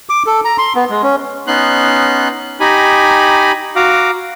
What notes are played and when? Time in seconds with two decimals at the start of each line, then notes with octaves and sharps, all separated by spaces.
0.09 D6
0.27 A4
0.45 A#5
0.58 C6
0.75 B3
0.90 G#3
1.03 C#4
1.47 B3 C#4 D#4 C6 F#6
2.60 D#4 G4 G#5 A#5 B5
3.76 F#4 F5 A#5 D6